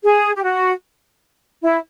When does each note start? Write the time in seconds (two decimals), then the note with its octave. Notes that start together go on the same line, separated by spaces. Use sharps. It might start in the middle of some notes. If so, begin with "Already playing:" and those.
0.03 G#4
0.35 G4
0.43 F#4
1.62 E4